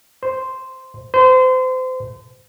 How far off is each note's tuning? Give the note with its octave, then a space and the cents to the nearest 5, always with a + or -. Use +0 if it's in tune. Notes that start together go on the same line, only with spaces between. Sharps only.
C5 -5
C5 -30